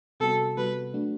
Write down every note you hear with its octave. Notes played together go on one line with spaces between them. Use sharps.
C3 G3 B3 F#4 A4
C3 G3 B3 F#4 B4
F#3 A3 D4 F#4